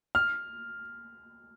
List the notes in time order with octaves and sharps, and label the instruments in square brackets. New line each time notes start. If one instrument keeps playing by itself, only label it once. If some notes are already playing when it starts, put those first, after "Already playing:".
[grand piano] F6